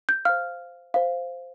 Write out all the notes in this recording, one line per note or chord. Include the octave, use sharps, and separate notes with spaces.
G6
C5 F5 F6
C5 F5